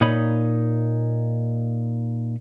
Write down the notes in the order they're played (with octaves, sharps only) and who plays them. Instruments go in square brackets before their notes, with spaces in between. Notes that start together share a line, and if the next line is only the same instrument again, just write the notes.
[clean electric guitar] A#2 D#4 C#5 D#5 B5